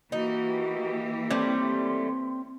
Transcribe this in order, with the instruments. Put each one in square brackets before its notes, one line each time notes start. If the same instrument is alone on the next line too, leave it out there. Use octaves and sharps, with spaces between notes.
[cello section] E3 A#3 G4 [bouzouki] D#4 [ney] F#4
[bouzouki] G3 A3 [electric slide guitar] C4 C5 C#5 [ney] C6